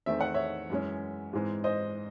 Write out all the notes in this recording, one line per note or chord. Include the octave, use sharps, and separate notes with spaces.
E2 D#3 A3 C4 E5
F#5
C#5 E5
F#2 E3 G#3 C#4
G#2 E3 G#3 C4
C5 D#5